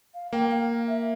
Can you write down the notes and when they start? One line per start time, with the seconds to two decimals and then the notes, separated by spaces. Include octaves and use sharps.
0.14 F5
0.33 A#3 G5
0.51 F5
0.88 E5